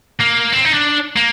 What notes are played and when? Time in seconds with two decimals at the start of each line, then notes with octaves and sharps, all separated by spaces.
0.20 A#3
0.53 C4
0.65 D#4
0.74 D4
1.17 A#3